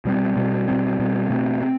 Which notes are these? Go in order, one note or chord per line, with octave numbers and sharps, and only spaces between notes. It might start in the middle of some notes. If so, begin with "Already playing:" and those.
B2 G3 C4
B2 G3 C4
B2 G3 C4
B2 G3 C4
B2 A3 C4
C4